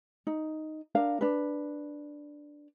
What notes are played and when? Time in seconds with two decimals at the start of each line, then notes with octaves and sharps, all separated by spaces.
0.27 D#4
0.95 D4 A#4 F5
1.21 D4 B4